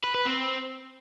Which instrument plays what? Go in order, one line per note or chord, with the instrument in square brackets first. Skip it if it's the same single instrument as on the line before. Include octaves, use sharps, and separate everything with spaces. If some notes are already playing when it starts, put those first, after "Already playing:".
[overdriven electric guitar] B4
B4
C4